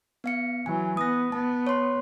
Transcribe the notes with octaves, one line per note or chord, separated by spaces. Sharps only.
B3 F5 C#7
E3 F#3 G#5
B3 D#6 A#6
B3 A5
C#5 C6